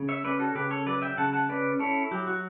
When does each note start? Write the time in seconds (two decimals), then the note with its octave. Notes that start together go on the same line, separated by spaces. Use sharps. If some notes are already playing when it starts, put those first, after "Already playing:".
Already playing: C#3
0.09 C#5 E5
0.24 C#4 B4 D5
0.39 F#4 A4
0.55 C#3 G4 B4
0.70 A4 C#5
0.86 F#3 B4 D5
1.02 E5 G5
1.17 C#3 F#5 A5
1.33 F#5 A5
1.49 C#4 B4 D5
1.79 E4 A4 C#5
2.11 F#3 G4
2.27 F#4